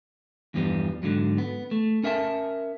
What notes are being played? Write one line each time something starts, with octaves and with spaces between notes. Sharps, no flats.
E2 G2 F3 G3 B3
G#2 D3 D#3 F#3
B3
A3
C#4 A#4 E5 F#5 A5